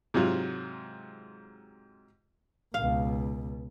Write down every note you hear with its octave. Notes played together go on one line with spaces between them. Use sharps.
G#2 C3 F#3 F4
C#2 B2 F5